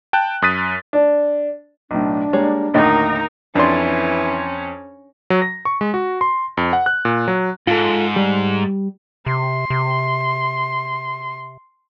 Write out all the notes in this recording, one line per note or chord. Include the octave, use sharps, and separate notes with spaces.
G5 A5 F#6
F#2 D#6 F#6 A6 B6 D#7
D4
B1 A2 D4
G3 G#3 A#3 C#5
D#2 A2 D3 D#4 F#4 A#4 D#5 A#5
F2 E3 C#4 D4 D5 C6
F#3
A#6
C#6
G#3
F#4
C6
F2
F#5
F#6
A#2
F#3
G#2 F4 A4
G3
C3 C6
C3